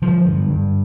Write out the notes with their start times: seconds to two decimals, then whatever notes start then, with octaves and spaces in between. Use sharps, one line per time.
0.02 D3 F3
0.26 G2
0.50 G2